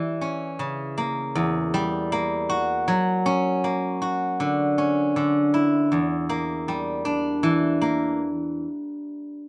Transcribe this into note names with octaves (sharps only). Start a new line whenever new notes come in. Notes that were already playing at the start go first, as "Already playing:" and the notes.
Already playing: E3 G3
C#4
C#3
A#3
E2
G3
A#3
F#4
F#3
C#4
A#3
F#4
D3
C#4
D3
E4
E2
A#3
G3
D4
E3
A#3